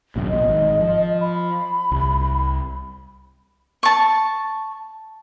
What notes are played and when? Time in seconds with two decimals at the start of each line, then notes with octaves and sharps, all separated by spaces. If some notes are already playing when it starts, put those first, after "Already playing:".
0.16 G#1 F#2 B2
0.29 A#1 B2 D#5
0.48 G#1 G#2 D#3
0.80 F3
1.21 B5
1.92 C2
3.83 A5 C#6